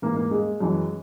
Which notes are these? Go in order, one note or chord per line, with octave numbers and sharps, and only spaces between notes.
G#2 E3 A#3
A#3
G#3
F#2 E3